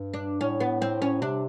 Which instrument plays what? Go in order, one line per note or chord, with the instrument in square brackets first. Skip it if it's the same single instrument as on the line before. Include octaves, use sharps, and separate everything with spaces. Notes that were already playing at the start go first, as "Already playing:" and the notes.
Already playing: [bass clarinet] G2
[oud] D4
[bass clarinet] A2 [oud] C#4
[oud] B3
C4
C#4
[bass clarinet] C3 [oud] D4